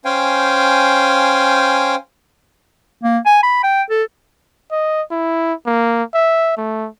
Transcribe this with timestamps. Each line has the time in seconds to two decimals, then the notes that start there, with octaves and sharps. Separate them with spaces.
0.05 C#4 C5 F5 G5 G#5
3.03 A#3
3.26 G#5
3.43 B5
3.63 G5
3.90 A4
4.71 D#5
5.11 E4
5.66 A#3
6.14 E5
6.57 A3